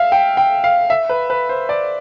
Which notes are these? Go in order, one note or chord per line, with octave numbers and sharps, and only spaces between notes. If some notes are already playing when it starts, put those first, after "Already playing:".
Already playing: E5 F5
G5
G5
F5
E5
B4
B4
C5
D5